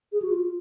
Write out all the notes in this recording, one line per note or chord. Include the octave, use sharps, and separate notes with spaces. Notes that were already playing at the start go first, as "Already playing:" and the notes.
G#4
F#4
F4